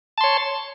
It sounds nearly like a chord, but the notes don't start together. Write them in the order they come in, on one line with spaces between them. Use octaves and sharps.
A5 C6 C#5